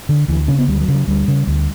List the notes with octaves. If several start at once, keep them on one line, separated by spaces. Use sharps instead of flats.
D3
D2 E3
C#3 C#4
B3
D2 G3
F#3
C#3
F#3
D2 G3
C#3
D2